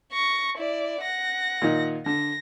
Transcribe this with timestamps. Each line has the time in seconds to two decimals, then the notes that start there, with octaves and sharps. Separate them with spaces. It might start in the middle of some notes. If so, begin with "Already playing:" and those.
0.13 C#6 A#6
0.58 E4 D5
1.01 F#5 A#6
1.62 A#2 D#3 D#4
2.06 D3 A#6